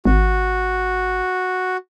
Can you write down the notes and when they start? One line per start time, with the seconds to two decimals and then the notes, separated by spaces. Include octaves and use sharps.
0.05 G#1 F#4